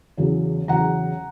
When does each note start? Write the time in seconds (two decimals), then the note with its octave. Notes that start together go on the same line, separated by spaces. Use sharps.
0.17 E2 C#3 F#3
0.68 E2 C#3 F#3 F#5 A#5